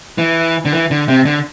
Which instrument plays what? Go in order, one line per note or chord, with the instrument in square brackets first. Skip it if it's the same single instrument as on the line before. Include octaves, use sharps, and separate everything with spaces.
[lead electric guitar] E3
D3
E3
D3
C3
D3